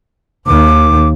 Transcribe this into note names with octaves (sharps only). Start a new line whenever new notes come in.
D#2 D#3 D6